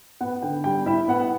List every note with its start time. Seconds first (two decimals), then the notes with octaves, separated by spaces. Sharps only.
0.21 B3 F#5
0.42 D3 G5
0.64 G3 G5
0.86 E4 E5
1.08 B3 F#5